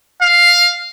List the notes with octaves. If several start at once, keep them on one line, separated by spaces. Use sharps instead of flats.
F5